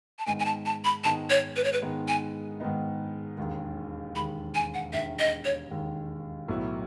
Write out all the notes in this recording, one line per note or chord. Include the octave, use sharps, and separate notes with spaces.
A5
G#2 D#3 G#3 B3 D#4 G#5
G#5
A5
A5
B5
G#2 D#3 G#3 B3 D#4 A5
C#5
B4
C#5
B4
G#2 D#3 G#3 B3 D#4
G#5
G#2 D#3 G#3 B3 D#4
E1 D#2 D#3 G#3
E1 D#2 D#3 G#3 B5
G#5
F#5
E1 D#2 D#3 G#3 E5
D#5
C#5
E1 D#2 D#3 G#3
B1 A2 F#3 B3 E4